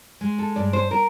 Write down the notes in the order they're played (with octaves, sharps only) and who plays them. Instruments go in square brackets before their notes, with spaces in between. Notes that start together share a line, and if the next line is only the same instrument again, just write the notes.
[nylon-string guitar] G#3
A4
G2 D5
C5
A#4